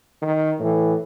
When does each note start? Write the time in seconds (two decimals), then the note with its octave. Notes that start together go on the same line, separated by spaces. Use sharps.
0.22 D#3
0.60 A2 E3